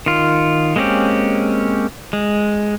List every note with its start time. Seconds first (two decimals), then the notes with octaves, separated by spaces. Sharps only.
0.06 D#3 F4
0.76 G#3 A#3 C4 C#4 G4
2.13 G#3